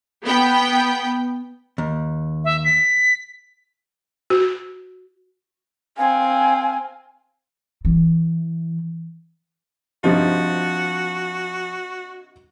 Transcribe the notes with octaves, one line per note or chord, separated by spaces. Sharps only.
B3 G5
D#2
E5
B6
F#4
C4 F5 G#5
E3
G2 C3 F3 D#4 F#4